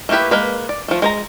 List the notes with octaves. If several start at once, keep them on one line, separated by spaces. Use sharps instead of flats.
A3 A#3 E4 G4 B4
G#3 A#3 B4
D5
F3 A3
G#3 C5 A#5